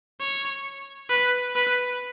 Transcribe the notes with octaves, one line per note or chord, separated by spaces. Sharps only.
C#5
B4
B4